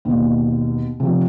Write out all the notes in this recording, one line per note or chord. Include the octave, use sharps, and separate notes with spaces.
D#2 B2
C3 F3